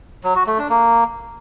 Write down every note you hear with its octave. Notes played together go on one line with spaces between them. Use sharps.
F#3
F#4
A3
D4
A#3